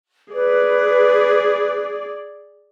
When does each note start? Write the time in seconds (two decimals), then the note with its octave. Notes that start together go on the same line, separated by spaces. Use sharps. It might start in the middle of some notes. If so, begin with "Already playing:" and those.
0.34 G#4 B4 D5